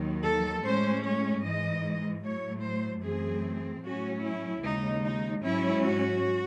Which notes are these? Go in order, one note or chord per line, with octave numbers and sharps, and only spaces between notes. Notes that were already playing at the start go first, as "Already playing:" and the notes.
Already playing: D#2 D#3 F#3
A4
A2 G#3 C#4 C5
C#5
G#2 E3 G#3 D#5
A2 F#3 A3 C#5
C5
F#2 E3 A3 C4 G#4
A2 F#3 C#4 F#4
E4
D#2 C#3 G#3 D#4
D#4
G#2 F#3 C#4 E4
F#4